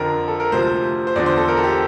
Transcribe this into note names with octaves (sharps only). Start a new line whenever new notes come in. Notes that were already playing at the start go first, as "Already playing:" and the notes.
Already playing: F2 D3 F3 A#4
A4
A#4
D2 C3 F3 C5
C5
E2 D3 F3 D5
C5
A4
A#4
A4
G4